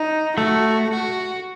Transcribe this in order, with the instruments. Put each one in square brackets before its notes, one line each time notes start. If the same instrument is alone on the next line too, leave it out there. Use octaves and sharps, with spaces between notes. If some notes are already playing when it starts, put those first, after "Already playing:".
Already playing: [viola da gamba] D#4
[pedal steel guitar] A3 [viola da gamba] F#4
[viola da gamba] F#4